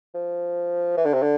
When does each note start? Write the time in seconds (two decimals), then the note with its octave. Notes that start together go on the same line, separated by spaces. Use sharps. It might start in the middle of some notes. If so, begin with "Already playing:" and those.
0.15 F3
0.97 E3
1.05 D3
1.14 C3
1.22 D3